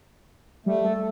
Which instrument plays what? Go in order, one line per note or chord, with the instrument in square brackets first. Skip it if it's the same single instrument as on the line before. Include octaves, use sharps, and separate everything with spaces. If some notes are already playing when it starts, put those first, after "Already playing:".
[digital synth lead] G3 [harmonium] A3
[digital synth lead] A4